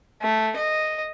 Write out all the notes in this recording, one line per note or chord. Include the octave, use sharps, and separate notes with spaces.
A3
D#5